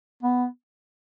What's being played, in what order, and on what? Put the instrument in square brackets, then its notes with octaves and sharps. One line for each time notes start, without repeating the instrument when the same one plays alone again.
[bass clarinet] B3